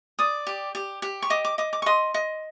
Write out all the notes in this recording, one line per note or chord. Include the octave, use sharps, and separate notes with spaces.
D5 D#6
G4
G4
G4
C#6
D#5 D6
D6
D#5 D6
D6
C#6
D#5 C6
D#5